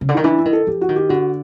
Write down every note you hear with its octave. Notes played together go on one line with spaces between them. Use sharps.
C#3
D3
D#3 D#4
E3 D4
E4
D#3
A4
F3 G4
F#4
D#3
G4
D3 F#4